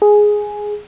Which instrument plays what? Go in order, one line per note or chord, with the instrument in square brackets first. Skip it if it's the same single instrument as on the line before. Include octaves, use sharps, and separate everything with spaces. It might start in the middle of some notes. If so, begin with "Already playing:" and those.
[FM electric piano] G#4